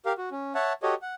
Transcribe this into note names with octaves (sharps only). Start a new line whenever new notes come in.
G4 A#4 F5
F#4
C#4
C#5 E5 F#5 A5
F#4 G4 A4 C#5 D#5
F#5